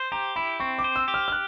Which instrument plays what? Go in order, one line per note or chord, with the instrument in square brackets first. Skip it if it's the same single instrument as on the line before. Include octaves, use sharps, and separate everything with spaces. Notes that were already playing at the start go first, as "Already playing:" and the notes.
Already playing: [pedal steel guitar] C5
[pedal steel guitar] G4 [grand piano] A#5
[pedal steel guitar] E4 [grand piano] B5
[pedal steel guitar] C4 [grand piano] C#6
[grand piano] D6
[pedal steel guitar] C5
[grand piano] E6
[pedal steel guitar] G4
[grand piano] F6
F6
F#6